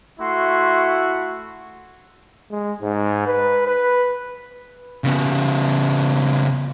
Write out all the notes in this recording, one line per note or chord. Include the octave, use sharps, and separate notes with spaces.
A3 E4 F#4 C6
G#3
G#2
B4
B4
C#3 B3